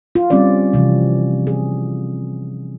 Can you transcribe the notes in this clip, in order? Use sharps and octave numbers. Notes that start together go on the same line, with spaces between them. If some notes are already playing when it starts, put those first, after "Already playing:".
F4
G3 C4 C#4 F4 D5
C3 E3 F3
G#4